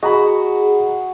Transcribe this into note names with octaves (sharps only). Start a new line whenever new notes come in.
F#4 G#4 D#5 A#5 B5